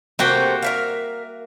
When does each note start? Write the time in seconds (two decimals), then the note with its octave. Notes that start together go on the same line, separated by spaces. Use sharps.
0.19 C3 A3 A#3 F#4 C5 G5
0.62 A#4 E5 F5